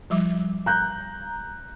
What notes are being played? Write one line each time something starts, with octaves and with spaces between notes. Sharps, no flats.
F3 G3 D6
A#5 F#6 G6